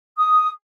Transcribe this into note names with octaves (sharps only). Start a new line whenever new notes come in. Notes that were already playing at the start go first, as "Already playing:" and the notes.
D#6